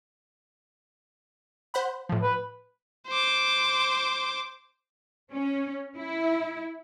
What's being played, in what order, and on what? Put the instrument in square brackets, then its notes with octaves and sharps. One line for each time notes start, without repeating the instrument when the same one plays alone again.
[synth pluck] C5 F#5 B5
A2 F3
[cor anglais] B4
[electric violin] C5 D6
[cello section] C#4
E4